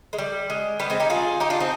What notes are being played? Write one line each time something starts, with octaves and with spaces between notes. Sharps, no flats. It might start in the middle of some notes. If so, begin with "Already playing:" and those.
G#3
G3
G#3
G3 B3
G#3 C4
D#4 G4
F4 G#4
D#4 G4
D4 F4
C4 D#4